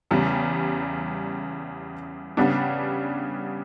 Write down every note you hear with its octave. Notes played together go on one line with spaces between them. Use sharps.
E2 C#3 G3
C#3 G3 B3 D4